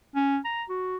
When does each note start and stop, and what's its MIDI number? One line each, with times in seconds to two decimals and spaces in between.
0.15 0.38 61
0.45 0.63 82
0.69 0.97 66